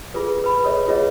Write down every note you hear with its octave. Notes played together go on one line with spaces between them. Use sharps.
F4 G#4 A4 B4
B4 B5
G#4 A4 B4 C#5 D#5 E5
F4 G#4 B4 C#5 D#5 F5